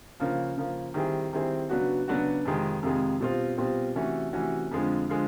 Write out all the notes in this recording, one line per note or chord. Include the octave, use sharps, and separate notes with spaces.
C#3 F3 A#3
C#3 F3 A#3
D#3 G3 C4 E4 G#4
D#3 G3 C4 E4 G#4
C#3 F#3 B3 D4 F#4
C#3 F#3 B3 D4 F#4
F2 C3 D#3 G#3
F2 C3 D#3 G#3
B2 G3 C4 F4
B2 G3 C4 F4
C3 E3 A3 C#4 F#4
C3 E3 A3 C#4 F#4
F2 D3 F3 G#3
D3 F3 G#3